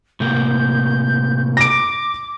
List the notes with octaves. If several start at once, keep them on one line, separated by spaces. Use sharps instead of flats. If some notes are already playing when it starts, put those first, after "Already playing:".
A2 C3 A#3 G6
D6 A#6 D7